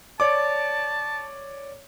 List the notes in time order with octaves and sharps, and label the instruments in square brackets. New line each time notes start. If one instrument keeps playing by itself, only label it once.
[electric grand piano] C#5 D5 D6 [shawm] A5